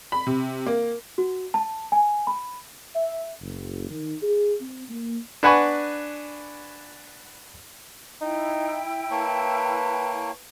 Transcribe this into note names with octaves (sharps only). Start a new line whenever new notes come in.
B5
C3
A#3
F#4
A5
G#5
B5
E5
F#1
D#3
G#4
C4
A#3
D4 B4 F#5 G#5 B5 C#6
D#4 E4 G5
A#3 B4 C#5 A5